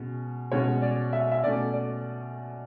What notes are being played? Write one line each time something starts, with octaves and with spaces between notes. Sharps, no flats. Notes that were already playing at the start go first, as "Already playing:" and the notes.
Already playing: B2 G#3 C#4
B2 G#3 C#4 C#5
D5
E5
E5
B2 A3 C#4 D5
D5